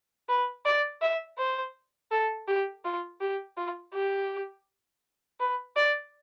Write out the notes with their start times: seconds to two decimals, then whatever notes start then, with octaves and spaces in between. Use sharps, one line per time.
0.29 B4
0.65 D5
1.02 E5
1.38 C5
2.11 A4
2.48 G4
2.85 F4
3.21 G4
3.57 F4
3.94 G4
5.40 B4
5.76 D5